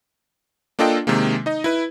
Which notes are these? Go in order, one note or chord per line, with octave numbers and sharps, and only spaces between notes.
A#3 D4 F4 A4 D#5 G5
C3 D#3 G#3 A#3
D#4 D#5
E4 B4